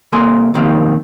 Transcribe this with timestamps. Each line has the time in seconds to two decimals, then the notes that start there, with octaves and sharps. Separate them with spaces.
0.12 C2 C3 A#3 A4 G#5 C6
0.54 B1 F2 D#3 A#3 C4 G4